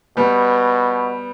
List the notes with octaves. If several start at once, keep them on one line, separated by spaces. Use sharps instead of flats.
B2 G3 B3